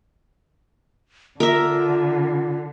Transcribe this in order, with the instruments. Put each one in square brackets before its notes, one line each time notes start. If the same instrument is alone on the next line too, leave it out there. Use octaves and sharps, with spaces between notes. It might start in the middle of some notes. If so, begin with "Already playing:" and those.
[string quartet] D3 [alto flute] F4 [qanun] A#4 E5